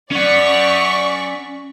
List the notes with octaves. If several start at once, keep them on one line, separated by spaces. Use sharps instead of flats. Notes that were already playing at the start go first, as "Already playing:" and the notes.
C#4 D5 F#5 C#6 B6